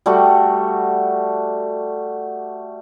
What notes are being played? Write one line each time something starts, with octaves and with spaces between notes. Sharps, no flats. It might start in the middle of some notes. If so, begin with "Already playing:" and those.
G3 A3 F#4